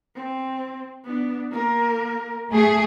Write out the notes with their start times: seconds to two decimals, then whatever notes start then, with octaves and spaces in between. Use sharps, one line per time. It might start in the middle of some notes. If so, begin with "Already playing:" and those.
0.15 C4
1.05 B3 D4
1.51 A#3 A#4
2.51 A3 G#4